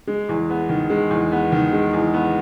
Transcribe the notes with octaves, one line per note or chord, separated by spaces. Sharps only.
G#3
E2
B3
D#3
G#3
E2
B3
D#3
G#3
E2
B3